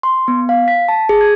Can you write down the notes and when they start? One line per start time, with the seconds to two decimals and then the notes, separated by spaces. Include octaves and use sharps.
0.03 C6
0.28 B3
0.49 F5
0.68 B6
0.88 A5
1.09 G#4
1.21 G#6